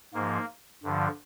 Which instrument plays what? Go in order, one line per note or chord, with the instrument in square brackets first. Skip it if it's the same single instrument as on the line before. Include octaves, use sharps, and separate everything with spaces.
[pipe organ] G#2 A#3
F3
G2 D3 F3